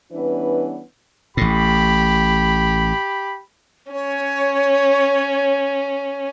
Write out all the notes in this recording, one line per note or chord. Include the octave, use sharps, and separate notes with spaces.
E3 G3 B3 C#4 D4 B4
A1 A2 G4 B5
C#4 C#5